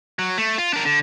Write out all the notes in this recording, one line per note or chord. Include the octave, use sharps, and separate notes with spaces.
F#3
A3
F4
D4 A#4
D3